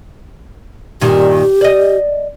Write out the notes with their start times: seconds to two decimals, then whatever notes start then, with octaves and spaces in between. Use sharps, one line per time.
1.01 G2 A#2 D#3 G4
1.61 D5 D#5